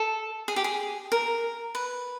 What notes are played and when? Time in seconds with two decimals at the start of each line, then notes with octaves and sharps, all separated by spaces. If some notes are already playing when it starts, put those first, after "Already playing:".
Already playing: A4
0.48 G#4
0.56 G4
0.64 G#4
1.12 A#4
1.75 B4